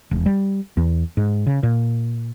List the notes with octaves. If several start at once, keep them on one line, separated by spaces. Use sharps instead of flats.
E1
G3
E2
G#2
C#3
A#2